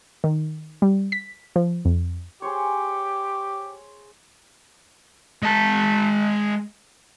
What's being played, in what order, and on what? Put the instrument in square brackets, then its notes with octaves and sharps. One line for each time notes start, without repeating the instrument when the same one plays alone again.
[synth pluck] D#3
G3
B6
F3
F2
[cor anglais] G4 [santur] G#4 C5 C#5
[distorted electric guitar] G#3 A5